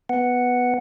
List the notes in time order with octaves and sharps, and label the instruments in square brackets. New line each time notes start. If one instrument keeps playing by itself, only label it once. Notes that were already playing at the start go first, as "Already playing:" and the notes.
[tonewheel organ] B3 F#5